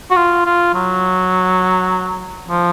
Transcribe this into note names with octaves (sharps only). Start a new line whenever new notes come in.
F#4
F4
F4
F#3
F3